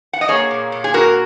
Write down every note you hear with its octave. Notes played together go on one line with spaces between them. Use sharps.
F#5
D#5
A#3 G#4 C#5
A#2
A#2
G#4
G#3 F#4 A#4